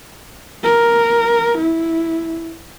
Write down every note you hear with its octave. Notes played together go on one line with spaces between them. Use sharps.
A#4
E4